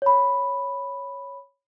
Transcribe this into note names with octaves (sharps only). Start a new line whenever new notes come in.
C#5 B5